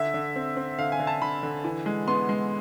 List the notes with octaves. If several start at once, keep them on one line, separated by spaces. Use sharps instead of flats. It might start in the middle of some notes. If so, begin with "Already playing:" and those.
Already playing: D3 E5
D3
C4
C4
D3 F5
G#5
D3
A5
D3 B5
D3
E3
G#3
B3 C6
G#3